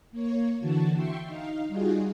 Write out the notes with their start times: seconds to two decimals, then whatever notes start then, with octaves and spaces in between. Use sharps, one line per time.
0.11 A#3 C#5
0.60 D3 E3 F#4 A5
0.94 E5 G5 C6 C#6
1.25 D#4 F5
1.68 G3 D#4 F4 F#4 G#4